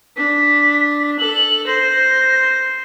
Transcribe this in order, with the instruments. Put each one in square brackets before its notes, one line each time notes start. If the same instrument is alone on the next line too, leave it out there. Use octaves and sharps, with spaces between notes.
[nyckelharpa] D4 [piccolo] B6
[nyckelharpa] A4 [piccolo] F#7
[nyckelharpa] C5 [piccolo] A#6